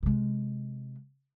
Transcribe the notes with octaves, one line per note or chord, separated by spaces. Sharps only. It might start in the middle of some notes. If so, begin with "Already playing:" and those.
C3 G#3